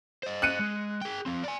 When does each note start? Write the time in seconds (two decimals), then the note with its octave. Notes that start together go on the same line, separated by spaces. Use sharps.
0.23 C5 D#5
0.42 F#6 C#7 D#7
0.59 G#3
1.01 G#4 G5
1.26 F3 C4
1.44 D5 G#5